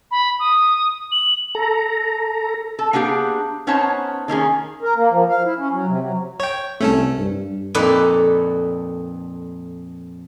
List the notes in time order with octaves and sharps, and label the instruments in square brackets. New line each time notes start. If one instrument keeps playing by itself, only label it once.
[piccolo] B5
D#6
F#7
[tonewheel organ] A4 A#5
[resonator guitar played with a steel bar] A4
A#3 B3 D4 G4 G#4
B3 C#4 D#4 C5 C#5 A5
D#3 A#3 C#4 G#4
[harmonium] A#4
A#3
F3
F5
E4
C#4
F#3
C3
F#3
[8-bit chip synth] C#5 G5
[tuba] C2 [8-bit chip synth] A3 C#4 A4
[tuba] G2
[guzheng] F2 A#2 D#4 A4 B4 D5